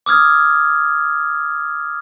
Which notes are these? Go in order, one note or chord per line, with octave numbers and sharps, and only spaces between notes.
D6 D#6 F6 G#6